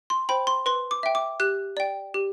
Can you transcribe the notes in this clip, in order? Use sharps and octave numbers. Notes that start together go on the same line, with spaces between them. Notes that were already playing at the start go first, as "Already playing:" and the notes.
C6
C5 G5 B5
C6
B4 C6
D6
E5 G5
D6
G4 F#6
D5 G5
G4